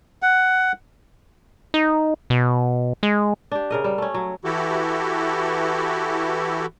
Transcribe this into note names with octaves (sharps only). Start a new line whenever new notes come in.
F#5
D#4
B2
G#3
D4 G4
C#3 A#4 D#5
G3
A3 C#4
F#3
E3 E4 F#4 G4 A4